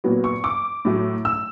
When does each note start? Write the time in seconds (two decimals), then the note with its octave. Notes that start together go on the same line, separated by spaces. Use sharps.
0.04 A#2 F#3 B3
0.24 C#6
0.44 D6
0.85 A2 F#3 A3
1.25 E6